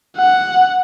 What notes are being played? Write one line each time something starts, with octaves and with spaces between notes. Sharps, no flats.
F#5